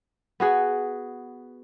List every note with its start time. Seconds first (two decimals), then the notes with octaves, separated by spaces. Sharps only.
0.40 B3 F#4 G#4